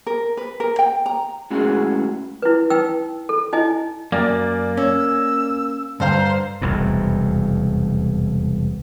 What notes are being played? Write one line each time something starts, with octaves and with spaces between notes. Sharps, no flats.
A#4
B4
A#4
G5
A#5
A2 G#3 C#4 E4 F#4 G#4
E4 B4
D#4 B4 G5 E6
A4
D#4 E4 D#5 G#5
F#2 A#3 D5 G#5 A6
C#4 E6
G2 D3 C5 F5 A#5
E1 C2 F2 A2